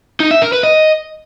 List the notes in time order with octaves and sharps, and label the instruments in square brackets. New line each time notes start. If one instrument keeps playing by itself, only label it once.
[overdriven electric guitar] D#4
E5
A#4
B4
D#5